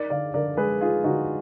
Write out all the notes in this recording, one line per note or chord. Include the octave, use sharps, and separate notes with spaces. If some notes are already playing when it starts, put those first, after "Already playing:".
Already playing: D#4 A#4 D5
D3 D5 F5
D3 A#4 D5
G#3 G#4 B4
D#4 F4 G#4
D3 D#4 F#4